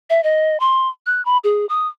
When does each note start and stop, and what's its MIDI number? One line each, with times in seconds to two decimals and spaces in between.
0.10 0.21 76
0.24 0.60 75
0.60 0.88 84
1.06 1.24 90
1.25 1.38 83
1.44 1.66 68
1.69 1.88 87